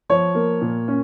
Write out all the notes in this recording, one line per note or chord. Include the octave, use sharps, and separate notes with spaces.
F3 C#5
A#3
A#2
C#4